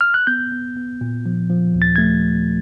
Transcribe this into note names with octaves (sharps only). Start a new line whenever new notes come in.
F6
F#6
B3 G6
B3
B3
A#2
F3
F3
D#2
A6
A3 G#6